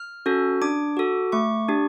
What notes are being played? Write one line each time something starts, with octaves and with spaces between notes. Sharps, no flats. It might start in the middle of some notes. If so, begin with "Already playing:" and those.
Already playing: F6
C#4 F#4 A4
D4 D6
F#4 A4
A3 C#6
D4 G4